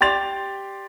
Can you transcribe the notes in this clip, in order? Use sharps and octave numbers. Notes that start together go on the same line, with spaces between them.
G4 D5 C6 A6 F7